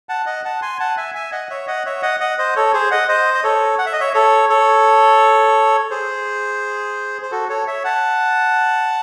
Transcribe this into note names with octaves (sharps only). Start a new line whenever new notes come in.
F#5 A5
D#5 F#5
F#5 A5
G#5 C6
F#5 A5
E5 G#5
E5 G#5
D#5 F#5
C#5 E5
D#5 F#5
C#5 E5
D#5 F#5
D#5 F#5
C5 D#5
A4 C#5
G#4 C5
D#5 F#5
C5 D#5
D#5
A4 C#5
F#5
E5
D#5
C#5 E5
A4 C#5
A4 C#5
G#4 C5
C5
F#4 A4
A4 C#5
C#5 E5
F#5 A5